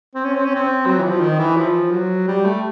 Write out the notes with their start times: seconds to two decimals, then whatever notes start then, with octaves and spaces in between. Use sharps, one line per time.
0.15 C4
0.25 C#4
0.35 C4
0.45 C#4
0.55 C4
0.86 F#3
0.99 E3
1.04 F3
1.21 D#3
1.39 E3
1.57 F3
1.92 F#3
2.28 G3
2.45 A3